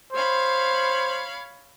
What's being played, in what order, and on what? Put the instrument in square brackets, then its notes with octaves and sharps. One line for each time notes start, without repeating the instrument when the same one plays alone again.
[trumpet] C5 [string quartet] C#5 F5 B5